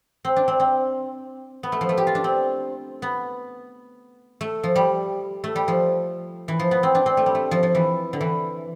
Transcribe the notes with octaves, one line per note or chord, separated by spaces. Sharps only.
C4
D4
C4
C4
B3
A3
F3
A3
G4
F4
D4
C4
B3
A3
F3
G3
A3
G3
F3
E3
F3
B3
C4
D4
C4
A3
G3
A3
F3
F3
E3
D3
E3